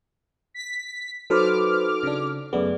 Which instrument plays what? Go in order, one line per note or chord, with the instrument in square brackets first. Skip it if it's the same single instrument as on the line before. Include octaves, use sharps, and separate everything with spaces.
[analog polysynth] B6
[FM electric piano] F#3 B4 C5 [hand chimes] D#4 F#4 A4 [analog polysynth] D6 F6
[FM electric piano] C#3 D4
[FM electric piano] F#2 A3 B3 [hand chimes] G#4 D5